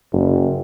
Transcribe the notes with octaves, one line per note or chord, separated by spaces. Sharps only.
F#1